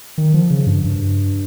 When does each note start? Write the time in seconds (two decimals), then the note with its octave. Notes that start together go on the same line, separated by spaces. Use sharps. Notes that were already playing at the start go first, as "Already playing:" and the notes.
0.18 D#3
0.34 F3
0.51 C#3
0.67 G2
0.84 G2